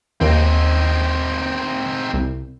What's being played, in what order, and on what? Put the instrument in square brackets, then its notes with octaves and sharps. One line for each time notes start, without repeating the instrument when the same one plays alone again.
[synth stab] D#2 [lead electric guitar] C4 D#4
[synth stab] C2